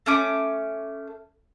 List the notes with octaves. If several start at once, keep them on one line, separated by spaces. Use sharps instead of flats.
A3 C#4 D6